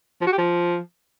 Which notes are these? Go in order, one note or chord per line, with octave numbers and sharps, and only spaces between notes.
F3
F#4
G4
F3